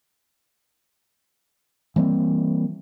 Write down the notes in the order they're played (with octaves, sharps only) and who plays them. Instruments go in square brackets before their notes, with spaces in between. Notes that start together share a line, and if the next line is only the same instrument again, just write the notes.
[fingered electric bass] E3 G3 A#3 C4